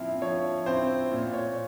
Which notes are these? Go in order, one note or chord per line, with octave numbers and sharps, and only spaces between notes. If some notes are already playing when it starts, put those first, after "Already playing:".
Already playing: F3 C4 E4 E5 F5
F3 C#5
C4 E4 C5
A#2
C#5